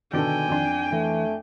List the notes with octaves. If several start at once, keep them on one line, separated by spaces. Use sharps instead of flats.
B2 D3 D#3 A4 D5 G5 G#5
F2 D4
E3 A3